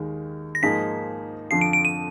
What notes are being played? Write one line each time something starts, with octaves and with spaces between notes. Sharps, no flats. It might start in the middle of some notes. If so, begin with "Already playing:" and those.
Already playing: D#2 D#3 G#3
A#6
G#2 F3 A#3 D#4 G#4 B6
F2 D3 F3 C7
D7
D7
D#7